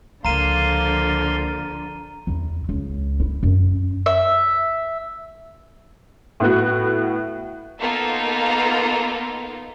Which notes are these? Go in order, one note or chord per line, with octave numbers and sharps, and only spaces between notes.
C#2 D3 F3 A#3 F5 A#5 C6 D#7
E2 E4
C#2
E4
F#2
E5
A2 B3 F#4
A#3 B3 D#4 F4 A4 A#4